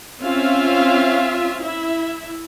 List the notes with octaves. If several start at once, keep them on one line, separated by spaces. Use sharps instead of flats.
C4 C#4 F4 E5 F5
E4 E5